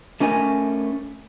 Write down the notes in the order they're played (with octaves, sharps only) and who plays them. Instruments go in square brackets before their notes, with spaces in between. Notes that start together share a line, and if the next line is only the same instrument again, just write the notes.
[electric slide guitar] A3 C#4 A#4 G#5